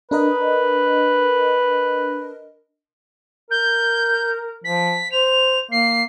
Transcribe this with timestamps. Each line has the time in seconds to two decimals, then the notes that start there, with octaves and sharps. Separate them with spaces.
0.11 D4 A#4 B4 D#5
3.50 A#4 G6
4.64 F3 B6
5.11 C5 F7
5.71 A#3 C7